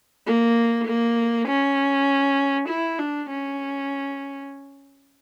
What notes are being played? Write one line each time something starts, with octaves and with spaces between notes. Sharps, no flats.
A#3
A#3
C#4
E4
D4
C#4